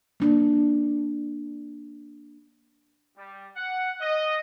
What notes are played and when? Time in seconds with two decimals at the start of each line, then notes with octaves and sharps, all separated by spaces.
0.20 A#3 D4
3.17 G3
3.56 F#5
4.01 D#5